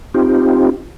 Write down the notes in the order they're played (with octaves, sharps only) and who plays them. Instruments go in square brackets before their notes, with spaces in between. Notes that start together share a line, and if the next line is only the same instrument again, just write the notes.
[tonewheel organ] C4 D#4 F4 G4